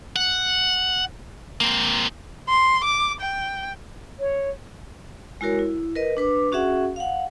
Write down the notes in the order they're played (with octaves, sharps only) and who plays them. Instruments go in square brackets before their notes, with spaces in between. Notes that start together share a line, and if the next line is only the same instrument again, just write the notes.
[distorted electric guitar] F#5
A#3 C4
[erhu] C6
D6
G5
[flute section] C#5
[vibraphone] G#3 E4 F#4 A#4 C#5
E4
A#4 B4 D#5
D4 B4 D6
C#4 F#4 G#4 E5 F#5
F5 F#5